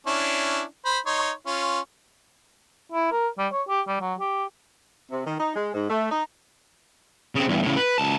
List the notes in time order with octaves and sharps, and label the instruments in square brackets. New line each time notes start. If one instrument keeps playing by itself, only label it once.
[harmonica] C#4 D4 E4
C5 B5
D#4 C#5 C6
C#4 F4
[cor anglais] E4
A#4
G3
C#5
G4
G3
F#3
G4
[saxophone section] C3
D#3
D#4
G#3
G#2
A3
D#4
[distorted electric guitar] C#3 C4
E2 G2
A2 C#3
B4
C#2 A5